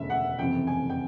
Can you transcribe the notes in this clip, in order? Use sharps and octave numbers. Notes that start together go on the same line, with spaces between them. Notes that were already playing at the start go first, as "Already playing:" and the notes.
Already playing: E1 D2 C#3 E3 E5
F#5
F#1 F2 C3 E3 G5
G#5
G5